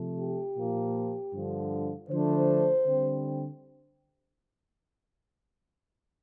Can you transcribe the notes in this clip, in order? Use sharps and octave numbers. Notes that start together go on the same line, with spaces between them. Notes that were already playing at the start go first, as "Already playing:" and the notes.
Already playing: C3 F3 A3
G4
A#2 F3 A#3
G2 D3 F3
D3 F3 A3 D4 C5
D3 G3 C4